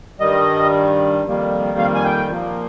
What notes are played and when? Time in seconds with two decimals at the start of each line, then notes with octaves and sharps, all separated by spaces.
0.20 G2 D#3 G3 D#5
1.25 F2 D#3 G3 A#3
1.78 F5
1.95 G#5
2.04 G5
2.30 A#2 F3 A#3